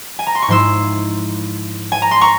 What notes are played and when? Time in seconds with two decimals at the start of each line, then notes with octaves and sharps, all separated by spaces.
0.19 G#5
0.27 A#5
0.35 C6
0.42 C#6
0.48 G#2 F3 G#3 E4 C6 E6
1.92 G#5
2.02 A#5
2.11 C6
2.21 A#5 C#6